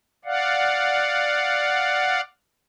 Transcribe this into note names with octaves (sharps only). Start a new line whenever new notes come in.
D5 F5 F#5